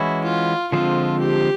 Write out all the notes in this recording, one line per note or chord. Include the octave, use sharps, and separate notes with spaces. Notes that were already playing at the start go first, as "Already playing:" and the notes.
Already playing: E3 G#3 C#4 E4 F#4
F4
D3 F3 G#3 C4 F4
G4